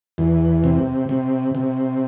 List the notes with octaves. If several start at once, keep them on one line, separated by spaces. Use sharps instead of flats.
E2
C3
C3
C3